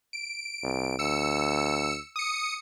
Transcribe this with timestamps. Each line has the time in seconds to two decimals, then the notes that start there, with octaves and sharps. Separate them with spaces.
0.13 D7
0.63 C2
0.99 D2 E6 C#7
2.16 D#6 C#7